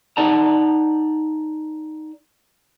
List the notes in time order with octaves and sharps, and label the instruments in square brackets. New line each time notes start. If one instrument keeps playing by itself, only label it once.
[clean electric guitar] D#4 D5 F#5 A5 A#5